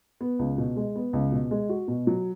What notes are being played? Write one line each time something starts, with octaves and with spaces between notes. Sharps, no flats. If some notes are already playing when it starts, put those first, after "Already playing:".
B3
C#2
B2
G#3
B3
C#2
B2
G#3
F#4
B2
F#3